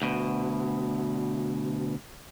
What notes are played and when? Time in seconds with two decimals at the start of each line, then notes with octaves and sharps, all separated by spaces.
0.02 D2 B2